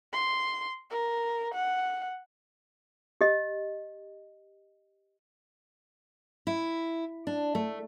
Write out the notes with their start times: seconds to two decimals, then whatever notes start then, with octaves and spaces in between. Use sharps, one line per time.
0.13 C6
0.90 A#4
1.54 F#5
3.21 G4 D#5
6.47 E4
7.27 D4
7.55 A3